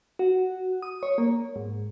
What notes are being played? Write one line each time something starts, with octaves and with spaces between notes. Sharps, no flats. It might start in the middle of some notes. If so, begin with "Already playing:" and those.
F#4
D#6
C#5
A#3
G#2